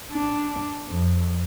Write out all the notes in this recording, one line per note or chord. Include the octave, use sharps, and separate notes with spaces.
D4
F2